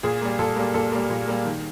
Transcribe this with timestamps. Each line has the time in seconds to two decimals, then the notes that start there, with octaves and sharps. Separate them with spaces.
0.03 A#2 G#4
0.21 G3 A#3
0.39 A#2 A4
0.56 G3 A#3
0.74 A#2 A4
0.92 G3 A#3
1.10 A#2
1.28 G3 A#3
1.45 D#3